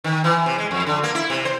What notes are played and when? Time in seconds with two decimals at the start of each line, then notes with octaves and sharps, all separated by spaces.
0.04 D#3
0.24 E3
0.46 C3
0.58 G#3
0.71 F2
0.86 D3
1.03 A#3
1.15 E4
1.30 C3
1.45 C5